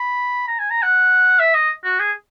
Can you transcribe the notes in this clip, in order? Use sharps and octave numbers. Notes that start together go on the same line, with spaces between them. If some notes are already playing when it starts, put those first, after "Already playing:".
Already playing: B5
A#5
G#5
A#5
F#5
E5
D#5
F#4
G#4